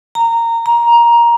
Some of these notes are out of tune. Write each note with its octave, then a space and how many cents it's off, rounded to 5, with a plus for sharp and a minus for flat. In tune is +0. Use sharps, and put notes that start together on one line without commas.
A#5 -15
A#5 +15